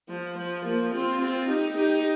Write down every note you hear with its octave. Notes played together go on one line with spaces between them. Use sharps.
F3
F3
F3 A#3
C4 F4
C4 F4
D#4 G4
D#4 G4